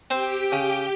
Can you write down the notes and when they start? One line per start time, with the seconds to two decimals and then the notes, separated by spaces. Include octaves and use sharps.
0.10 C4 G4 C5 G5
0.52 C#3